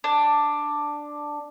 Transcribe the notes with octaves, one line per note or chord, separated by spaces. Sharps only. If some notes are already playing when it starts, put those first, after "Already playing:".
D4